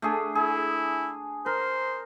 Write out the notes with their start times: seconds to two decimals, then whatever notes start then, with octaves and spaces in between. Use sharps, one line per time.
0.02 A3 D4 G#4
0.35 E4 G#4
1.46 A#4 C5